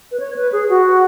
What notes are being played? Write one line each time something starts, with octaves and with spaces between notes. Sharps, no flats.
B4
C#5
B4
G#4
F#4